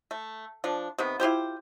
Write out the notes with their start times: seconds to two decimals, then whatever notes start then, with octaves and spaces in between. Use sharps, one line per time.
0.11 A3
0.64 F3 D4
0.98 C3 D#3 B3
1.20 E4 F4 G4 C5